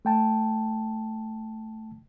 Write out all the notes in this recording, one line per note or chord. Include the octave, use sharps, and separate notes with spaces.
A3 G5 A5